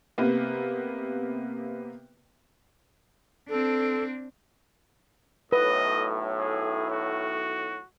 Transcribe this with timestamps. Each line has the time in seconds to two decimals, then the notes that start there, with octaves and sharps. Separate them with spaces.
0.18 C3 A#3 B3
3.49 C4 D4 A4
5.52 B1 A2 B4 D#5
6.39 G#4
6.91 F#4